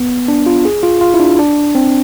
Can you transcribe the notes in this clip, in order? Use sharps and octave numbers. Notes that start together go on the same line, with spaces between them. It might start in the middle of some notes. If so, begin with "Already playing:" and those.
Already playing: B3
D4
F4
G#4
F4
F4
E4
D4
D4
C4